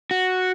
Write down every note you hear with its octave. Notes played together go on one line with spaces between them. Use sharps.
F#4